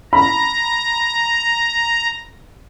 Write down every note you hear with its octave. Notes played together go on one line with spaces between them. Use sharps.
A#5 B5